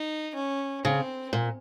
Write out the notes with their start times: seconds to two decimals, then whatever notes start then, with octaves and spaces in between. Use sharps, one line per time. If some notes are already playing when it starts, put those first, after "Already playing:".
Already playing: D#4
0.35 C#4
0.85 C#3 C4
1.33 A#2